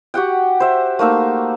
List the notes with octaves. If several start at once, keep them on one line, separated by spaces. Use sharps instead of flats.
F#4 G4 F#5 G5
C5 E5
A3 A#3 D#4 E6